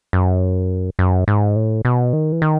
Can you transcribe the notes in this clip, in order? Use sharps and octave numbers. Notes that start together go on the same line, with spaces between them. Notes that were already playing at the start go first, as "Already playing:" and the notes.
F#2
F#2
G#2
A2
B2
D#3
E3
D#3